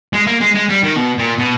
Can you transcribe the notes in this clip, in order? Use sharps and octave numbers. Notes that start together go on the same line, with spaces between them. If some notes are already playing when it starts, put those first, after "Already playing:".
G#3
A#3
G#3
G#3
G3
D#3
B2
A#2
B2